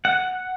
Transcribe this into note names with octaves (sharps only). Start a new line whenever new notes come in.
F#5